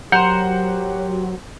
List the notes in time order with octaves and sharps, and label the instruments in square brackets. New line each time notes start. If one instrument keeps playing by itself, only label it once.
[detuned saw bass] F#3 [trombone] G4 [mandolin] A#4 C5 [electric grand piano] F#5 G6 C#7